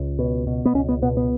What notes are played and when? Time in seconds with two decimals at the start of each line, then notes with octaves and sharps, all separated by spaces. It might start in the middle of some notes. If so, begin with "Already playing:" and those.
Already playing: C#2
0.19 B2
0.47 B2
0.66 B3
0.74 C#2 C#4
0.89 B3
1.02 B2 B3
1.17 B3